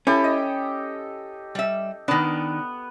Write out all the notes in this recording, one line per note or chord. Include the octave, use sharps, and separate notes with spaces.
C#4 E4 G4 A4
D#5
G3 E5
D#3 B3 D4